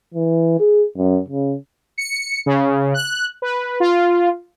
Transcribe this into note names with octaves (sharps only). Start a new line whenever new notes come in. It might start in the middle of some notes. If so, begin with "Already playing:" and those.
E3
G#4
F#2
C#3
C#7
C#3
F#6
B4
F4